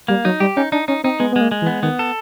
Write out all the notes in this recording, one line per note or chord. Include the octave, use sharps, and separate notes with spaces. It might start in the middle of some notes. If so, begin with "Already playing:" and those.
G3 A#3
F#3 D#4
G3 G4
C#4 D#4
D4 D#4
C#4 D#4
C4 D#4
G#3 B3
B3
G#3
A#3
G#3
E3
B3
D#3 B3
A4